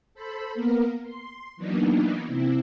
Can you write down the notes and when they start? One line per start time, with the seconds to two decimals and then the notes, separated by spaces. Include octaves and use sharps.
0.14 A4 C5 B5
0.54 A#3 B3 A#4
1.03 C6
1.57 E3 F#3 A#3 B3 D4 D#4
2.26 C3 C4 E4